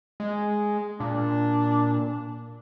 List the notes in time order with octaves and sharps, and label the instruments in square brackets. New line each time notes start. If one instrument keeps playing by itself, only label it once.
[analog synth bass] G#3
[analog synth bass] A#2 [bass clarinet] D4